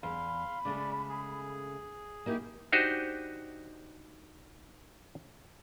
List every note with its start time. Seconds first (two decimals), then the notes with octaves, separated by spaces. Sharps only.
0.03 E2 F5 B5 C6
0.65 C#3 G#3 A3 D5
1.09 G#4
2.26 A#3 D#4 E4 G4
2.72 D4 D#4 F#4 G4 C5 D#5